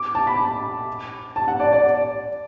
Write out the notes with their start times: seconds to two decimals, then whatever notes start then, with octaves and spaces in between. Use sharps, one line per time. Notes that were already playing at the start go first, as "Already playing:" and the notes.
Already playing: D6
0.15 A5
0.27 B5
1.36 A5
1.48 F#5
1.60 D5
1.73 D5